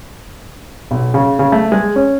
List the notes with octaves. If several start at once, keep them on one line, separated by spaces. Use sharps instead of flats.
B1
C#3
C#3
A3
G#3
C#4